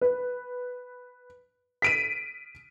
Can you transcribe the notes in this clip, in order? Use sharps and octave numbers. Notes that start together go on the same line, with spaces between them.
B4
B6 D7 D#7